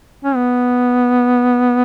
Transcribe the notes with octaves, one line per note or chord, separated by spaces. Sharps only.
C#4
B3